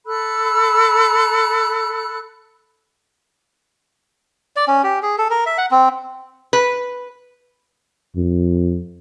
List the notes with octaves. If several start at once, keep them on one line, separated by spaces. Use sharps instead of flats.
A4 B5 E6 F#6
D5
C#4
G4
G#4
A4
A#4
E5
F#5
C4
B4
F2